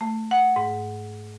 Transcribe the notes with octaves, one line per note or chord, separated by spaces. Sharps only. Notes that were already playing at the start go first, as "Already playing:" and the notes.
A3
F#5
G#2